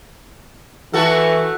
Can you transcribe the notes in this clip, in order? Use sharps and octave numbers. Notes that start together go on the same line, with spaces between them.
E3 A3 F#4 A4